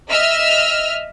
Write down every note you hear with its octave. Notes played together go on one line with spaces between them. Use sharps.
D#5 E5 E6 F6